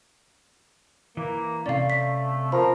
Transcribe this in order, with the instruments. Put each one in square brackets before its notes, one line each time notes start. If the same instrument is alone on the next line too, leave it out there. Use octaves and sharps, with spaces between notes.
[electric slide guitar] E3 [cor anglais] A#3
[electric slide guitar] C3 C#4 [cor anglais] A3 [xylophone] D5 F5
[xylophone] B6
[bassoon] F3 [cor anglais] A#4 [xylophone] B5